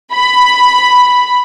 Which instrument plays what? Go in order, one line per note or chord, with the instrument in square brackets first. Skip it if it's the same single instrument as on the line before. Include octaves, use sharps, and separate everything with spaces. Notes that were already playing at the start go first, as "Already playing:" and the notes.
[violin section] B5